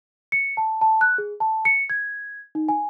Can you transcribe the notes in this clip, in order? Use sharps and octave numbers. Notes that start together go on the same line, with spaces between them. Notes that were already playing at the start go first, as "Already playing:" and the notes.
C#7
A5
A5
F#6
G#4
A5
C#7
G#6
D#4
G#5